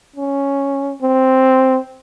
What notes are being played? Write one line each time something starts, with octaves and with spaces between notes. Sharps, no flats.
C#4
C4